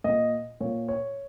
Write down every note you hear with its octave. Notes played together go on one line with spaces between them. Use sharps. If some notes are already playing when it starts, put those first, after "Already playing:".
A#2 D#5
A#2 C#5
C#5